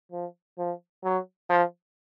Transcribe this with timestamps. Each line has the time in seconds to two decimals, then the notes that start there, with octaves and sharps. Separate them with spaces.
0.12 F3
0.58 F3
1.04 F#3
1.50 F3